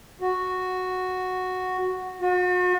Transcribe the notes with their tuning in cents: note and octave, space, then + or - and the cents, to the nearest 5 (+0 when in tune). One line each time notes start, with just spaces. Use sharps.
F#4 -5
F#4 -40